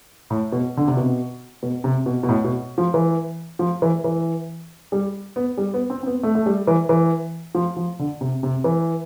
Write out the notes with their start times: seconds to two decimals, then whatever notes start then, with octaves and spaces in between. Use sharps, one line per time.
0.30 A2
0.52 B2
0.77 D3
0.87 C3
0.97 B2
1.63 B2
1.84 C3
2.06 B2
2.23 B2
2.29 A2
2.44 B2
2.78 F3
2.94 E3
3.59 F3
3.82 E3
4.04 E3
4.92 G3
5.36 B3
5.58 G3
5.74 B3
5.90 C4
6.03 C4
6.06 B3
6.23 A3
6.35 A3
6.46 G3
6.67 E3
6.89 E3
7.55 F3
7.77 F3
7.99 D3
8.21 C3
8.43 C3
8.64 E3